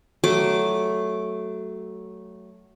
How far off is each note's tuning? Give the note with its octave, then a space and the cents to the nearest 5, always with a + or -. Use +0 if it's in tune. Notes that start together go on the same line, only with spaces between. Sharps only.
F#3 +15 A3 +0 D6 +0